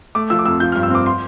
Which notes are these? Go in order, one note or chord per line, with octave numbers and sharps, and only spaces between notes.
A3 D6
F3 E6
D6
F2 E6
F3 G6
F6
G2
E6
C4 D6
C6